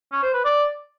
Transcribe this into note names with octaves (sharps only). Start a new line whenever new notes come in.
C#4
C5
B4
D5